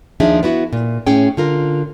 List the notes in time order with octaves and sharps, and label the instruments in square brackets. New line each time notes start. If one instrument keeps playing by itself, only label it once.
[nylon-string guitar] D#2 F3 D4 D#4 G#4 E5
B3 E4 F#4
A#2
A2 C#4 G#4 G5
D3 F4 A#4